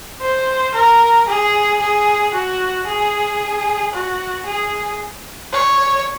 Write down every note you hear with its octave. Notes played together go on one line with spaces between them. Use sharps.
C5
A#4
G#4
G#4
F#4
G#4
F#4
G#4
C#5